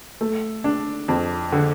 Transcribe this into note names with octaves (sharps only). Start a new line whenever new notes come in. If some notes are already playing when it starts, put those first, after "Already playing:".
A3
D4
F2
D3